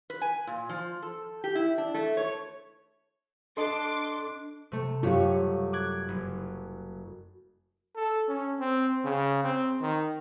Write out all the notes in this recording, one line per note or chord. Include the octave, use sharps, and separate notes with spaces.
B4
G#5
A#2
F3
A4
G4
E4
D4
A3
C#5
D4 A4 D#5 A5 C6 D6
C3 A3
F#2 A3 F4 G4 C#5
G3
D6 F#6 G#6
F#1
A4
C#4
C4
C#3
C4
D#3